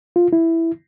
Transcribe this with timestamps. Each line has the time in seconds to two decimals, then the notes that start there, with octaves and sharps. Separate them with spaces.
0.16 F4
0.33 E4